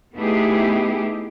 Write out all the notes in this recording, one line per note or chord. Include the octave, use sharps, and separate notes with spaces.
A3 B3 D#4 E4 G4 G#4